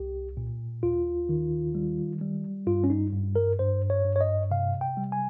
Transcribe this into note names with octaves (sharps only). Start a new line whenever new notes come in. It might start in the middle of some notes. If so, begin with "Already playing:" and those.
Already playing: C2 G4
A#2
D#2 F4
D#3
G3
G3
G2 F4
C#4
D#4
G2
A#4
G2 C5
C#5
G2
C#5
D#5
C3 F5
G5
G3
G#5